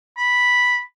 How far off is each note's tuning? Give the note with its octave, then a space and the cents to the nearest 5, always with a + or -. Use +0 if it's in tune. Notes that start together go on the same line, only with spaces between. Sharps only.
B5 -5